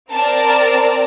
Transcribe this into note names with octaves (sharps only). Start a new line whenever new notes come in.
C4 A#4 D5 A5